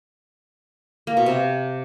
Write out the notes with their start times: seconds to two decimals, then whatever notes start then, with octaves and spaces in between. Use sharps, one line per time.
1.07 A#3
1.17 B2
1.26 C3